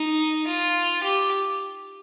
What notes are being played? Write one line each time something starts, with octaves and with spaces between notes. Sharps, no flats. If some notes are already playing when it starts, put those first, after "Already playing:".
Already playing: D#4
F4
G4